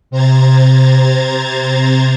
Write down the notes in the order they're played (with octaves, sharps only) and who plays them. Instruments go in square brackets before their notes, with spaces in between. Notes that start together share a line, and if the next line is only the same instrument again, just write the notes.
[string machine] C3 C5 A#5 G#6 A6